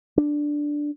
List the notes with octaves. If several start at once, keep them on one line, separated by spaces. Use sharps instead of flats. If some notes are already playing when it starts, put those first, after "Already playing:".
D4